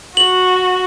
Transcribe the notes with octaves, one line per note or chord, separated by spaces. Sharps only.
F#4 F#7